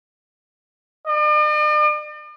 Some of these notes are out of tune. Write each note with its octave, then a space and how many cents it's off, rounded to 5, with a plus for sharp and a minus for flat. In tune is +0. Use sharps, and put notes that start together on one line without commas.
D5 +45